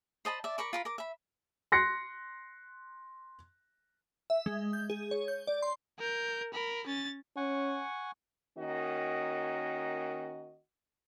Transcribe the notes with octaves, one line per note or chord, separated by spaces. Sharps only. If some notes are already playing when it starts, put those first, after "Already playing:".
C5 D#5 A5 B5
D5 E5
A#4 B5 C#6 D6
F4 A#4 B5
A#4 D6
E5 B5
C6 F#6 A#6 C7 C#7
E5
G#3
G6
G#4
C#5
G6
D5
C6
A#4 G6
A#4 B5
C#4 A6
C#4 F#5 G#5 C#6
D#3 A#3 C#4 F#4 D#5